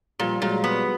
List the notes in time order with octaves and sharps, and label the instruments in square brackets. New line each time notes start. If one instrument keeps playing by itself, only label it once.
[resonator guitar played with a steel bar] A#2 [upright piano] F3 G3
[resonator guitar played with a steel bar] A#2 [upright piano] F#3 G#3
[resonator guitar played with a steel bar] B3